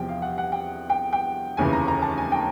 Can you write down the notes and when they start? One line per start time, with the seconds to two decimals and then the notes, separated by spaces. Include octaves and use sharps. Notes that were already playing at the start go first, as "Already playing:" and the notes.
Already playing: E2 C3 F3 G5
0.08 F5
0.22 F#5
0.38 F#5
0.52 G5
0.90 G5
1.13 G5
1.57 F1 D#2 C#3 E3 G#5
1.73 A#5
1.88 A#5
2.02 A5
2.18 G#5
2.32 G5